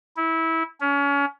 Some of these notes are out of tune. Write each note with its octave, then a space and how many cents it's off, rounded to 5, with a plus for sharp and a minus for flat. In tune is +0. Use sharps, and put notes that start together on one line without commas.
E4 -20
C#4 +30